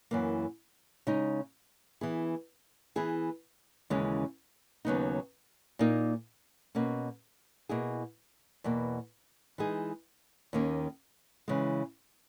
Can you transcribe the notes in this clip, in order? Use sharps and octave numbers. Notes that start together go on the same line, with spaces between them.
F#2 E3 A#3
C#3 G#3 D#4
E3 B3 E4 G#4
E3 B3 E4 G#4
D#2 C#3 E3 G#3 C#4
D#2 C#3 F#3 B3 D#4
A#2 A#3 D#4
B2 A#3 C#4
B2 A#3 E4 G#4
E2 B2 A#3
E3 G#3 D#4 G#4
D#2 D#3 A#3 C#4
C#3 E3 G#3